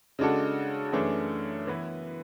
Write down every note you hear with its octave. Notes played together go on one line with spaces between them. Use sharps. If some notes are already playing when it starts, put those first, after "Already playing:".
C#3 G#3 D4 F#4 A4
F#2 E3 A3 D4 G#4
E3 B3 E4 B4